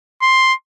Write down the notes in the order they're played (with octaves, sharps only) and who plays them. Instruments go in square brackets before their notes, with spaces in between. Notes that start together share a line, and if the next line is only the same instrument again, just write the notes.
[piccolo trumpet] C6